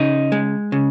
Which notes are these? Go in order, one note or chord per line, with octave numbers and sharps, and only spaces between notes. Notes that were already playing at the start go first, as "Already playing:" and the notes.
Already playing: C#3 D#4
G#3
C#3